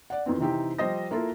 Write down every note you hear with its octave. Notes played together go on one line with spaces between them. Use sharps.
D5 F#5
F2 D#3 E3 B3 C4
C3 E3 C4 D#4 G4
F3 G3 C5 D#5 D#6 A#6
A#3 E4 F4 A4